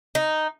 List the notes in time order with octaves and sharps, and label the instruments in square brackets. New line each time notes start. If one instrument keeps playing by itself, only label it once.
[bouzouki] D#4